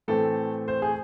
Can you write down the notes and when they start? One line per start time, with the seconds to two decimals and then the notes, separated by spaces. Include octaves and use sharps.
0.08 A2 E3 A3 C4 A4
0.68 C5
0.82 G#4